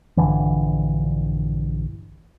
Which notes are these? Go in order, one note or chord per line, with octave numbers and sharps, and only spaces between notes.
A#1 G2 D3 E3